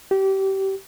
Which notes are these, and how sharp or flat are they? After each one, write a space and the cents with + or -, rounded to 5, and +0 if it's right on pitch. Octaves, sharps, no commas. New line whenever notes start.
G4 -25